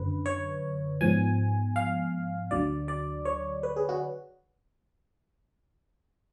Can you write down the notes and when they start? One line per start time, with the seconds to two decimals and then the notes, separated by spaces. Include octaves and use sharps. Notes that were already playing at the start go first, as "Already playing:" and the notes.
Already playing: F#2 D3 B4
0.26 C#5
1.01 G#2 F3 B3 G#5
1.76 F5
2.51 D2 D3 F#3 D5
2.88 D5
3.25 C#5
3.63 B4
3.76 G#4
3.89 F#4